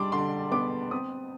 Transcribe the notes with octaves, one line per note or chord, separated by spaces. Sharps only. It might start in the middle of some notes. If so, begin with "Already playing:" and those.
Already playing: G3 D4 C6 D6
D3 C6
B3 D6
C4 D#6